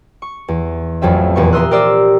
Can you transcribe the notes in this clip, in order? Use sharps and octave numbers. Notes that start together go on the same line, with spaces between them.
C#6
E2
A1 F2 F#3 C4 E5
F1 E2 A#2 B3 C#6
E5 A#5 C6 D#6 E6 F#6
G4 A#4 C5 D5 D#6 E6